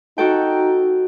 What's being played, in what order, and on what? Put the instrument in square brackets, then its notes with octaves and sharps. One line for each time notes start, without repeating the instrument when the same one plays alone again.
[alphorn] D#4 [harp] F#4 A4 G5